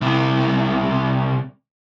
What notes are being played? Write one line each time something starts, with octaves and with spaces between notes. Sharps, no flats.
C2 C3